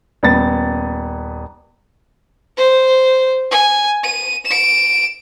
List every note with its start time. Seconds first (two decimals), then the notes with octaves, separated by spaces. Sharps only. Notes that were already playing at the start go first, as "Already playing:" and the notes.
0.23 D#1 B3 A6
2.57 C5
3.52 G#5
4.04 D#7
4.46 D7 E7